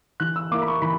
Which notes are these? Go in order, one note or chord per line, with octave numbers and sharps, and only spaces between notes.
E3 F#6
E6
A#3 E4 D6
B5
C#6
E3 B5